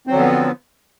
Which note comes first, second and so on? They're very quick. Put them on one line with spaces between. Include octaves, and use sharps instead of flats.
C4 F#3 D3 F3 B3